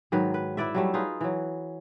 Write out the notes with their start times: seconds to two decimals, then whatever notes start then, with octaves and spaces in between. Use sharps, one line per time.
0.12 G#2 D#3 F#3 B4
0.34 B4
0.57 E4 B4 D5 E5
0.75 F#3 G3 A3
0.94 D#4 F4 G#4 B4
1.21 E3 F#3